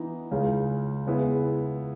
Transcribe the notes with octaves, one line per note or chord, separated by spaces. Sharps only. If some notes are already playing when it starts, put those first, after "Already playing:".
Already playing: E3 B3 D#4
C#2 C#3 G#3
C#3 G#3 B3 E4